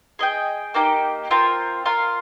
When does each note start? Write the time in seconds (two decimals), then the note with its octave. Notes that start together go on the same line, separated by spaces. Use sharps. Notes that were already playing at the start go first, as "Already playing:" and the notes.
0.19 G#4 D#5 G5
0.74 A#3 D#4 G4
1.31 C4 F4 A#4
1.86 F4 A#4 F5